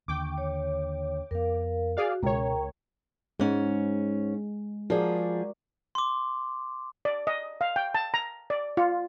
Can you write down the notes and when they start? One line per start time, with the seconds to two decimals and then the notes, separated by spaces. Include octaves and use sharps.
0.08 D#2 D3 G5 C#6 D6
0.38 C#5
1.31 F2 B3 A#4 F5
1.97 F#4 G#4 D5 F5
2.23 C#2 B2 A#4 C#5 G5 A#5
3.40 G#2 G#3 C#4
4.90 F3 F#4 G#4 A#4 D5
5.95 C6 D6
7.05 D5
7.27 D#5
7.61 F5
7.76 G5
7.95 A5
8.14 A#5
8.50 D5
8.77 F4